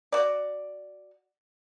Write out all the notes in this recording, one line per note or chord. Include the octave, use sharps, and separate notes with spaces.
F#4 D5